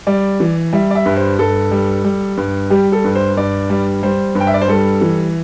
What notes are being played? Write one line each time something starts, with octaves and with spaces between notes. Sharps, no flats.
G3 D5
E3
G3 E5
D5
E5
G2
C5
G2 A4
G3
G3
G2
G3 G4
A4
G2
C5
G2 D5
G3
G3 C5
G2
G5
E5
D5
C5
G3 A4
E3